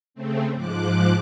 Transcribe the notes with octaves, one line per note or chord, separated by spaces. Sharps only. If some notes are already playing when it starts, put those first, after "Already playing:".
C#3 A3 C4
G#2 F3 D6 F#6